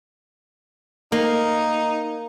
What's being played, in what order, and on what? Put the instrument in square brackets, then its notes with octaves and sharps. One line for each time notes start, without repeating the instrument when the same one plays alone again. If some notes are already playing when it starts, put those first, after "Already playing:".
[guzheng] A#3 [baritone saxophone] D#4